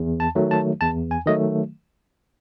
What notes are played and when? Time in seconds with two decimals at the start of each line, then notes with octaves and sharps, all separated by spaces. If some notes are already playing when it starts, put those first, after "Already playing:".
Already playing: E2
0.20 A5
0.35 D#3 F#3 A3
0.51 A5
0.81 E2 A5
1.11 G#5
1.26 D#3 F#3 A3 D#5